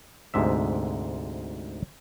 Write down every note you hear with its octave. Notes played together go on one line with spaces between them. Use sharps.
D2 G#2 C3 E5